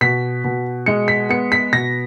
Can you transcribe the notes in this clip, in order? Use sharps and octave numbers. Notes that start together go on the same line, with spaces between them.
B2 B6
B2
G#3 C#7
B6
B3 C#7
B6
B2 A#6